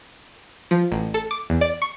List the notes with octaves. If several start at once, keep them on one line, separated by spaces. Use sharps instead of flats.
F3
A1
A4
D6
E2
D5
C#6